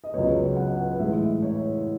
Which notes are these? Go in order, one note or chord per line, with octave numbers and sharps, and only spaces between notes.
D#5
C#2 C#3 F#3 B3 C#5
F#5
A2 E3 G#3 E5
C#5